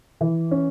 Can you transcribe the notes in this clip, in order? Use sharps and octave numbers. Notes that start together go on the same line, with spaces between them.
E3
C#4